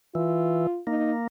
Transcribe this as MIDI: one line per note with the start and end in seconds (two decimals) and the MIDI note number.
0.15 0.67 52
0.15 0.81 65
0.87 1.27 58
0.87 1.12 63